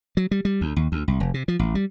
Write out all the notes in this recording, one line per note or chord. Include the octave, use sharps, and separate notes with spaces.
F#3
G3
G3
D2
D#2
D2
C2
F1
C3
F3
A1
G3